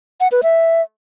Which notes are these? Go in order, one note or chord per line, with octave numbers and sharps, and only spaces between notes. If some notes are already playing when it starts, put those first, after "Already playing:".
F#5
B4
E5